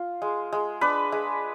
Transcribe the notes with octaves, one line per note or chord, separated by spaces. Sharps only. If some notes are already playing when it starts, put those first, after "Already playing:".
Already playing: F4
G#3
G#3
D4 B4
G#3